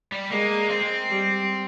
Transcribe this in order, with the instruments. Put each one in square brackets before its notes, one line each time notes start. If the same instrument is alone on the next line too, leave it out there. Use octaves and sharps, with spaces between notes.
[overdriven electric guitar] G3
[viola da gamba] G#3 [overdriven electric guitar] A#3
[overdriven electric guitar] C4
[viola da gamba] G3